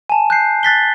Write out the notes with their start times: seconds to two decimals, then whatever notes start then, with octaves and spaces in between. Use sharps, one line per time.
0.10 G#5 A5
0.30 F#6 G6 C7
0.63 F#6 A6 B6 G7